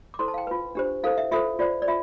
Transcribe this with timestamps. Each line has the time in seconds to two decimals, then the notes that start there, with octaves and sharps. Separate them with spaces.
0.14 D6
0.19 E4 A4 C5 C6
0.28 A5
0.34 F5
0.38 G5
0.47 F4 B4
0.75 D4 G4 C5
1.03 E4 A4 C5 F5
1.18 E5
1.31 F4 A4 C5 E5
1.59 F4 C5 D5
1.82 D5
1.88 F4 E5